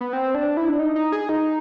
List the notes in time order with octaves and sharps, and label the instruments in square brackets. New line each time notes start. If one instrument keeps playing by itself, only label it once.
[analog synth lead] B3
C4
D4
E4
D4
D#4
D#4
G#4
D#4